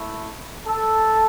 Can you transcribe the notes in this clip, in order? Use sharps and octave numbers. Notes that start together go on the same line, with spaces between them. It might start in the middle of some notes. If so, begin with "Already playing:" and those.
Already playing: A3 E4
A4